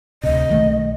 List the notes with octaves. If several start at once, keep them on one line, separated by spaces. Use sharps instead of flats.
D2 C3 D#5
B1 D#3 A3